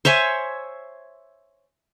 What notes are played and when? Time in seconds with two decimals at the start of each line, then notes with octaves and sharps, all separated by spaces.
0.05 C5 C#5 E5 G#5